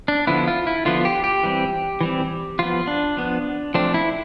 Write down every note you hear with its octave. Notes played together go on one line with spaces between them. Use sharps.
D4
D3 F3 B3 E4
F4
E4
D3 F3 B3 F4
G4
G4
E3 G3 C4
E3 G3 C4
F3 B3 F4
D4
F3 B3
F3 A3 C4 D4
E4